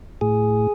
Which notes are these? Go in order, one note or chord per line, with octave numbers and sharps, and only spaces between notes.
A2 G#4